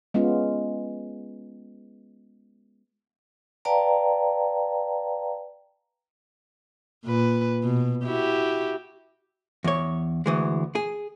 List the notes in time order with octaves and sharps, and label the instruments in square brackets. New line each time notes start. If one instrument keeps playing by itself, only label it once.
[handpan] G#3 B3 C#4 F4
[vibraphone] B4 D5 F5 G5 A5 A#5
[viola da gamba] A#2 B4
B2
E4 F#4 G4
[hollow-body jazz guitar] E2 C#5
D2 E3 G#3
G#4